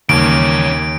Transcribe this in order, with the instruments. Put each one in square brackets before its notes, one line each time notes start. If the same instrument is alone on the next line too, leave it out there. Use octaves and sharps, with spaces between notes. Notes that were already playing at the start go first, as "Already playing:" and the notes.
[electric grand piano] D#2 [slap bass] C#3 E3 G3 [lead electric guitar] A#3 C#4 [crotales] D7